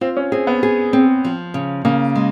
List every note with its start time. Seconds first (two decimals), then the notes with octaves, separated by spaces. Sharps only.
0.01 C4 F4
0.17 C#4
0.32 C4 G#4
0.47 B3
0.63 G#4
0.93 C4
1.25 F3
1.54 C#3
1.85 C#3 A#3
2.16 G#3